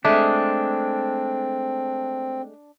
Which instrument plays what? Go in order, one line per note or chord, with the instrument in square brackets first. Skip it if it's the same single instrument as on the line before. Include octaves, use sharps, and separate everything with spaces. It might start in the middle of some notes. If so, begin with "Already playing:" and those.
[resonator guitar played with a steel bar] G#3 A3 [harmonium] C4 [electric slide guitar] D4